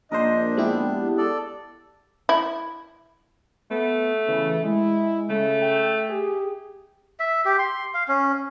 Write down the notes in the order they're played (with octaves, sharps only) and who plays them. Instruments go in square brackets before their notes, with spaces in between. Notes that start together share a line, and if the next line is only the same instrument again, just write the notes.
[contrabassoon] A#1 [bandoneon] D4 [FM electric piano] A#4 C5 [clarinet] D#5
[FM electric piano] G#3 E4 G4 [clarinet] B3
[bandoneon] A4 D5
[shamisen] E4
[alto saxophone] A3 [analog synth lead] B3
[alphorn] C#3 [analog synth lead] E3
[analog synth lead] G#3 [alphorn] E4
[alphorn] C#3 [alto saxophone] A3
[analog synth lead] G5
[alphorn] G4 [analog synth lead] G#4
[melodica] E5
G4
C6
F5
C#4